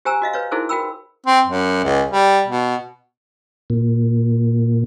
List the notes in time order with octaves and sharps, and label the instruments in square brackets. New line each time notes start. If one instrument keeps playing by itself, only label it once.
[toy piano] G4 C5 G#5 A#5 E6
F#4 D#5 F5
B4 C#5 F5
D#4 E4 F#4 G#4 A#4 C5
F#4 A#4 G5 B5 E6
[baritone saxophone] C4
F#2
C#2
G3
B2
[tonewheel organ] A#2